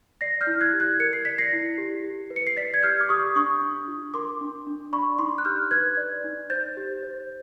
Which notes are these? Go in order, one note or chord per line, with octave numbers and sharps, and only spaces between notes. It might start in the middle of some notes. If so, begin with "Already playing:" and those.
D5 A#6 C7
F6 G6
E4
F#6 G#6
G4
F#6 G#6
A#4 C#7
C7
D5 B6
A#6 C7
E4
G4
G4
B4
C#7
C7
D5 A6 B6
G#6
G4 F6 G6
D6
G4 C#6 D#6
D4 C#6 D#6
D4
F4
A#4 C6 D6
D4
D4
D5 B5 C#6
D#4 C6 D6
F#6
G4 F6 G6
B4 F#6 G#6
D5
D#4
C5 G6 A6
G4
C5